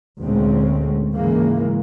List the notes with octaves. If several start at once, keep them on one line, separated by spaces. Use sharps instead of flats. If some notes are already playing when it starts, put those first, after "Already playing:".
D2 A#2 G#3 C4 C#4
G#2 C#3 E3 G#3 A#3